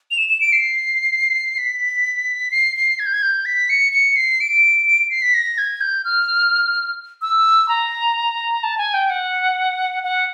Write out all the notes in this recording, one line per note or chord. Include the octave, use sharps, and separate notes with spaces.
F7
E7
E7
D7
C7
B6
C7
C7
G#6
G6
G#6
G6
B6
C#7
C#7
C7
D7
D7
C7
B6
A#6
G#6
G6
F6
E6
A#5
A5
G#5
G5
F#5
F#5